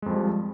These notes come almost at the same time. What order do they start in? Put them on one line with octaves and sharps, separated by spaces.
G#3 F2 F3 G3